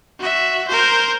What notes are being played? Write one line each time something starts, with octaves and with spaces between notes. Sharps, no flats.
F#4 E5
A#4 C5